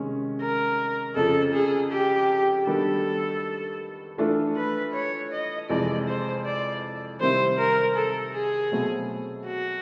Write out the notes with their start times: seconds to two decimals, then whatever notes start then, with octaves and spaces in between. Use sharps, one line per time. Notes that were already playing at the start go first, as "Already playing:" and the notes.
Already playing: C3 D#3 G#3 C#4
0.41 A#4
1.16 F2 C#3 F3 A4
1.53 G#4
1.91 G4
2.67 D#3 G3 B3 D4 F#4 A4
4.18 E3 A3 D4 F4 A4
4.56 B4
4.94 C#5
5.32 D#5
5.69 F2 C3 E3 G#3 D5
6.08 C5
6.45 D5
7.21 C3 D#3 G3 C4 E4 C5
7.58 A#4
7.96 A4
8.33 G#4
8.72 B2 F#3 A3 C4
9.47 F#4